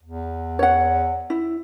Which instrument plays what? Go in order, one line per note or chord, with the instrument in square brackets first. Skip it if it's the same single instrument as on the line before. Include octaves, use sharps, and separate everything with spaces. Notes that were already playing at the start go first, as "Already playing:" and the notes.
[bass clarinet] E2
[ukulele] C#5 F#5
E4